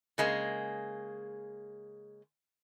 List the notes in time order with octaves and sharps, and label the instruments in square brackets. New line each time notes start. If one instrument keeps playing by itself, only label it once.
[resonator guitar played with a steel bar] C#3 G#3 A#3